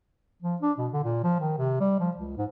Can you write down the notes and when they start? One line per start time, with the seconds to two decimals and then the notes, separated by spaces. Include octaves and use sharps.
0.42 F3
0.62 D4
0.78 B2
0.93 D3
1.04 A#2
1.23 F3
1.40 D#3
1.58 C3
1.80 G3
2.00 F3
2.17 C#2
2.37 G#2